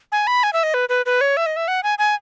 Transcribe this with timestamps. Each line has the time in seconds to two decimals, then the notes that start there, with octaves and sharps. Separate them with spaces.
0.12 G#5
0.27 B5
0.43 G#5
0.53 E5
0.63 D#5
0.74 B4
0.89 B4
1.06 B4
1.21 C#5
1.37 E5
1.46 D#5
1.56 E5
1.68 F#5
1.83 G#5
1.99 G#5